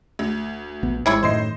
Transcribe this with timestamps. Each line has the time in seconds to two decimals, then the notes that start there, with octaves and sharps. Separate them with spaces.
0.19 D2
0.83 A#1 B3
1.06 G#1 C3 G#3 E4 C#5
1.23 F#2 A2 D#3 C5 D#5 C7